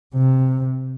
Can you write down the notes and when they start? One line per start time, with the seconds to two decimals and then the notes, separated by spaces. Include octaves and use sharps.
0.15 C3